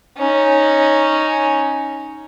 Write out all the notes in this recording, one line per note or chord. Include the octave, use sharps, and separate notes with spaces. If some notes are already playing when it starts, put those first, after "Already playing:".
C#4 D#4